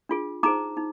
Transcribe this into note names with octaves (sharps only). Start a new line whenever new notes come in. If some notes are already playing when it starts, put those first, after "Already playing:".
D4 F4 G#4
D#4 G#4 C5 A#5 D6
D#4